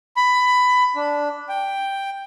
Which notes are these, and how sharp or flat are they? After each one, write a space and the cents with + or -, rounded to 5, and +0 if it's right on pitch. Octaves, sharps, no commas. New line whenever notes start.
B5 +15
D4 -5
G5 +5